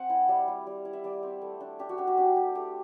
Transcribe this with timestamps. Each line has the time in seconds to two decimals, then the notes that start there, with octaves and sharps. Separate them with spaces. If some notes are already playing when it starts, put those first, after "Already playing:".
Already playing: C4 F#5
0.10 E4
0.28 G3
0.48 G3
0.67 G3
0.85 E4
0.93 E5
1.04 G3 D5
1.23 C4
1.42 A3
1.60 D4
1.79 D4 G4
1.89 F#4
1.98 D4 G4
2.07 F#4
2.18 D4 G4
2.36 A3 G4
2.55 A3 G4